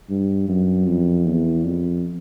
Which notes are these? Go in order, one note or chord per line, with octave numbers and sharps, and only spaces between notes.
G2
F#2
F2
E2
F2